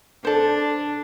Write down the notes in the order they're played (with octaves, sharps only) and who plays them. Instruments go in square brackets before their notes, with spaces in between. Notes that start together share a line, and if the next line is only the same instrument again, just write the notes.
[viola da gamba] D4 [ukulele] A4 C5